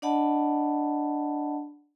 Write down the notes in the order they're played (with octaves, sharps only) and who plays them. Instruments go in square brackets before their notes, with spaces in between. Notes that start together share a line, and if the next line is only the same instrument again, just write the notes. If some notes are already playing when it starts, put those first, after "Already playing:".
[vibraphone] D4 D5 D#5 F#5 A5 B5